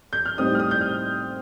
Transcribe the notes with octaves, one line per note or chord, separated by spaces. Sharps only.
G6
F6
A2 G3 C4 D#4 D#6
F6
D#6
G6
F6